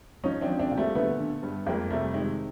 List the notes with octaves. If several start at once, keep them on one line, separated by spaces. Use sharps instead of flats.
F3 C#4 D#4
C4 D4
F3
C4 D4
A#2
G3 A3
D3 A3 B3
D3
G2
F2 G#3 A#3
C3 G3 A3
D#3 G#3